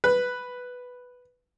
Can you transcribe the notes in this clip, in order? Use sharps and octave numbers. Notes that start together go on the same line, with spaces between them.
B4